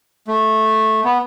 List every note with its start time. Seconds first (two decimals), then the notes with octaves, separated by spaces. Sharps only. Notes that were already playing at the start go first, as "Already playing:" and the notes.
0.28 A3
1.05 B3